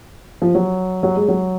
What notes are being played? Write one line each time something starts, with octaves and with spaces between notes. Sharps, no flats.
F3
F#3
F#3
G#3
F#3